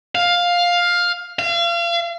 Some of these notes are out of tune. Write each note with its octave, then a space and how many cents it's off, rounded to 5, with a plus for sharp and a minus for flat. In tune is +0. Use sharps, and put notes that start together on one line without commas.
F5 +10
F5 -35